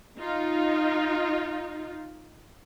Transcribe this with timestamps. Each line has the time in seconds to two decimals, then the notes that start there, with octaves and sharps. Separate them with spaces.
0.19 D#4 F4